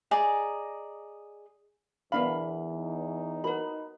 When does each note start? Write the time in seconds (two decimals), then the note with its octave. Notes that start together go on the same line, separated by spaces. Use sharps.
0.11 G#4 D5 D#5 A#5
2.12 E2 B3 D4 A#4 E5 F5 B5
2.73 D#4
3.44 F#4 A#4 B4 B5